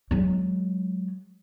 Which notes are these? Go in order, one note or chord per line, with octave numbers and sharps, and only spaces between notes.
F#3 G#3